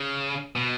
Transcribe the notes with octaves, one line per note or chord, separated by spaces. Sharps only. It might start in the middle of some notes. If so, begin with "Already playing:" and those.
Already playing: C#3
B2